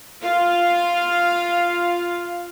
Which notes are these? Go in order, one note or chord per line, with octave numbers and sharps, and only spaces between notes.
F4 F5